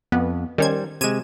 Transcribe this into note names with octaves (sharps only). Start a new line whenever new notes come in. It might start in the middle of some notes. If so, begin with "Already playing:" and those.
F2 B3
D#3 G3 C#4 C5 G#6
C3 G#3 G#6 D#7 E7